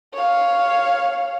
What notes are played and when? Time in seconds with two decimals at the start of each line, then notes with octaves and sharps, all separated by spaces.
0.13 C#5 F5